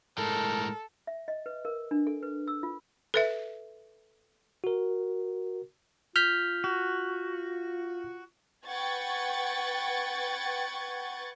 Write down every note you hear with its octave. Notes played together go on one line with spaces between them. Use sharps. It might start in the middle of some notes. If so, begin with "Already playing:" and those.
A2 G#3 A4 A#4
E5
D#5
B4
A#4
D4
A4
B4
E6
F4
A4 B4 E5
F#4 A#4
F4 F6 G6 B6
F#4
B4 F#5 G5 C#6 G#6 A6